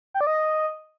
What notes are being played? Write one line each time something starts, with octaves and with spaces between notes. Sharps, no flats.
G5
D5
D#5